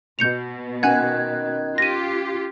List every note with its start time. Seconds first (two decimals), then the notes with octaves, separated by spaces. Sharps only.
0.19 B2 G6 C#7 F7
0.83 D#3 C#4 F#5 G#5 F#6 G#6
1.78 F4 G4 A#6 D#7